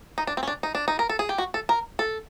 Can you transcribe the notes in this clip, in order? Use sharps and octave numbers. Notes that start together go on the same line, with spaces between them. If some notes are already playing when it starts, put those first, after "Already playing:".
D#4
D4
C4
C#4
D4
D#4
D4
D#4
A#4
A4
G#4
G4
F#4
A4
A#4
A4